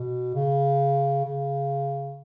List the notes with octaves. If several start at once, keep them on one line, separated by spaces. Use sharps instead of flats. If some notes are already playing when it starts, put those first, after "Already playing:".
Already playing: B2
C#3
C#3